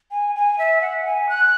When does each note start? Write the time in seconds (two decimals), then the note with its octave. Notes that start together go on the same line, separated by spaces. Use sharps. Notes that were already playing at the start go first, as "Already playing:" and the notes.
0.11 G#5
0.36 G#5
0.59 E5
0.82 F#5
1.06 G#5
1.29 F#6